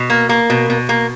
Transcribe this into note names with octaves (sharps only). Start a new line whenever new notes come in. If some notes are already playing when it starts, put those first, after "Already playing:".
Already playing: B2
A#3
A#3
B2
B2
A#3